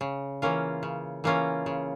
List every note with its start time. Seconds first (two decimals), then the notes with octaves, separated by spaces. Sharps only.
0.01 C#3
0.42 E3 A#3 C#4 F4
0.83 C#3
1.24 E3 A#3 C#4 F4
1.66 C#3